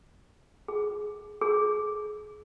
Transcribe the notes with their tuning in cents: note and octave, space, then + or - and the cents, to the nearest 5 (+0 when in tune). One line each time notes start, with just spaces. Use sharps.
G#4 +10
G#4 +30